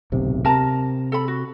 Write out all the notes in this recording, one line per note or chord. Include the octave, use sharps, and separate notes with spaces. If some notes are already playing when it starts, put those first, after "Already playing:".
D1 B1 C3
C3 A#4 A5 A#5
A4 B5
F#4